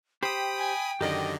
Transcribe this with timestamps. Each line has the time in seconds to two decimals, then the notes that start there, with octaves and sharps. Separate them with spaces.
0.23 G4 C5 G5 B5 D#6
0.58 G#5
1.01 F#2 D3 D#3 G4 A#4 D5 D#5